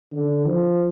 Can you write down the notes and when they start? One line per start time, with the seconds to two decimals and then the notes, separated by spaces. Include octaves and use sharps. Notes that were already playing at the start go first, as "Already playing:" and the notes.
0.12 D3
0.46 F3